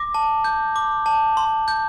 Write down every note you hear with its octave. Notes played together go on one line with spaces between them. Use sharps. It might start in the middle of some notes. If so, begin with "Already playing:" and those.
Already playing: D6 A#6
A5
G6
D6
A5
C6
G6